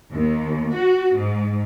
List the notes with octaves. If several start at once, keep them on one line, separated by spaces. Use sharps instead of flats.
D#2
F#4
G#2